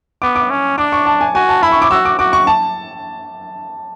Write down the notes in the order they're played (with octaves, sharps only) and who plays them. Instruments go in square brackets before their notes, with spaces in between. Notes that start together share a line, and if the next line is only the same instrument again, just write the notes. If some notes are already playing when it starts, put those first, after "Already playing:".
[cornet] B3 [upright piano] D6
[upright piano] D6
[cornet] C#4
[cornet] D4 [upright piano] D6
[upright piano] C#6
A5
G#5
[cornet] F#4 [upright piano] G#5
[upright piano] A5
[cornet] E4 [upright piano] B5
[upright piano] C#6
D6
[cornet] F#4 [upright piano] E6
[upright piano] D6
[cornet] F#4 [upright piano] D6
[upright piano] C#6
A5